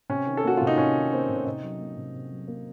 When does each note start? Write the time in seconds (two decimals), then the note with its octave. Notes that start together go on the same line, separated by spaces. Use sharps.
0.09 C3 C#4
0.27 D#3
0.37 A4
0.44 A#3 F#4
0.57 C3 F4
0.67 D#4
0.77 C3 C#4
0.95 D#3
1.12 A#3 C4
1.29 C3
1.36 C#4
1.46 C3 D#4
1.63 F#3
1.80 A#3
1.97 C3
2.14 C3
2.31 F#3
2.48 A#3